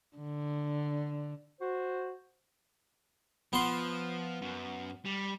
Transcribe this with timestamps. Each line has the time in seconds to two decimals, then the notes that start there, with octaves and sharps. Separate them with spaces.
0.17 D3
1.61 F#4 C5
3.53 F3 B3 C6
4.41 F#2
5.05 G3